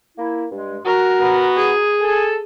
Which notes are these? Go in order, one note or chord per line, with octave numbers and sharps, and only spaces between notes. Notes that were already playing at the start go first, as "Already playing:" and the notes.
A#3 E4
G2 G#3
F#4 A#4
B3
G#4
A4 G#5